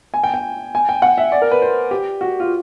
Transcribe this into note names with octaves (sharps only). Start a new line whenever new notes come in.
G#5
G5
G5
G#5
G5
F#5
E5
D5
A#4
B4
C5
G4
F#4
F4